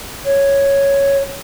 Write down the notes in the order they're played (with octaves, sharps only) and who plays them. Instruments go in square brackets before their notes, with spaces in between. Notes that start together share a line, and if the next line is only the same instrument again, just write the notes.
[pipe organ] C#5